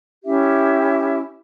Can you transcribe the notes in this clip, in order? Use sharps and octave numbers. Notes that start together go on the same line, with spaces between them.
C#4 E4 G4 E5